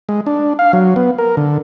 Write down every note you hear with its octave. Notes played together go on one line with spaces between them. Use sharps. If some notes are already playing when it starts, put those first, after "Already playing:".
G#3
D4
F5
F#3
B3
A#4
D3